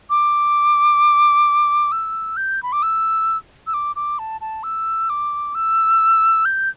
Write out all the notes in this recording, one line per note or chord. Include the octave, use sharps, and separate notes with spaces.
D6
E6
G6
B5
D6
E6
E6
D6
D6
A5
A5
E6
D6
E6
G6